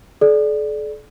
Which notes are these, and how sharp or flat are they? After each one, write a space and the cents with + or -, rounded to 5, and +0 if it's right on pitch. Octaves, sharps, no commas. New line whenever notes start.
A4 -45 D5 +0